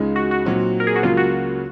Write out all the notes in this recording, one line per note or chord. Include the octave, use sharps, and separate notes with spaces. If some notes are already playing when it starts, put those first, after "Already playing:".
Already playing: C#2 C#3 G#3 D#4
F#4
F#4
A#2 F#3 C4 D#4
A#4
G#4
F#4
C#2 C#3 F#3 A#3 F4
F#4